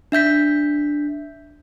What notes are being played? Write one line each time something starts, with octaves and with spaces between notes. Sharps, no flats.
D4 E5 G6 B6